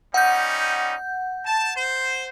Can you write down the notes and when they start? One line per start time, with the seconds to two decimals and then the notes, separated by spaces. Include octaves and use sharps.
0.14 G3 C#4 D#4 F#5 G6
1.45 A5
1.76 C5